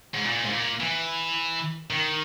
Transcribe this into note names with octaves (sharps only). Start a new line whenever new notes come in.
G#2
A#2
G#2
A#2
E3
D#3